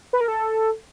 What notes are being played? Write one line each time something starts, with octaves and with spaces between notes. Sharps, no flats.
B4
A#4
A4